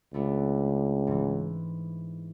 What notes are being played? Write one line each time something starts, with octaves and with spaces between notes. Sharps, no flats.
C#2 A3 B3 D4
G#2 E3